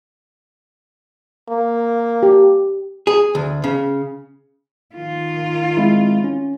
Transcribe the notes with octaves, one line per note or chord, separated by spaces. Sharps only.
A#3
G4
G#4
D2
C#3
D#3 F4
G#3 C4 E4
C#4